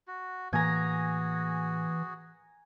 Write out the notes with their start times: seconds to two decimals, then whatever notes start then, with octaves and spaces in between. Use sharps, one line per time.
0.08 F#4
0.53 A2 E3 A#3 F#4 G#4 G#5 A#5